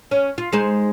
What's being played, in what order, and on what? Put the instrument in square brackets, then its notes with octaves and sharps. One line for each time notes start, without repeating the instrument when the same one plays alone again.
[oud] C#4
F4
G#3 D#4 C5